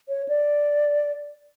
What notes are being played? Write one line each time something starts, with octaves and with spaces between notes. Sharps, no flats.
C#5
D5